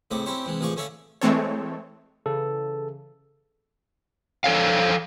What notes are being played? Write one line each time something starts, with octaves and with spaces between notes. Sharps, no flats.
A2 C#3 C4 D#5 D6
C4 C#4 E4 G4 C5 C#5
C3 E3 G#3
A1 F3 G#4 D5 C#6 D6
D3 C#4 C#5 D5 E5 F5
E3 G#3 A3 C4 A4 C#5
C#3 E3 A4
F3 A4 C#5 F5